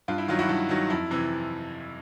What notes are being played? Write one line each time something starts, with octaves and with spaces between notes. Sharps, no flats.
G2 F4
E4
D#3 F#3 F4
E4 F#4
G2 E4
D#3 F#3
F2 E4
C3 E3